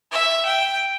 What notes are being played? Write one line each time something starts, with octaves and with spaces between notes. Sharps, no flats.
E5
G5